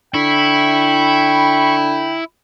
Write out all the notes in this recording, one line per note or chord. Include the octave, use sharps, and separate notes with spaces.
D3 E4 G5 B5 C#6